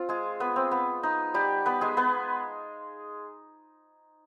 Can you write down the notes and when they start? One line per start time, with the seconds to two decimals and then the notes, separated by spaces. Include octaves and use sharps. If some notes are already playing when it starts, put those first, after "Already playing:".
Already playing: C4 F4
0.09 G#3 G#4
0.40 B3 B4
0.56 C4
0.71 B3
1.03 D#4
1.34 G3 G4
1.66 B3 B4
1.81 G#3 G#4
1.97 B3 B4